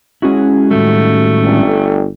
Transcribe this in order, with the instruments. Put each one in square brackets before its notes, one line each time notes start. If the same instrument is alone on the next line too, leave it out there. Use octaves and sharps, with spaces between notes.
[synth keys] G#3 C#4 F#4 [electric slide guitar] E4 G#4
[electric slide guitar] A2 D#3 G3 [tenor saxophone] A3
[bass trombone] G1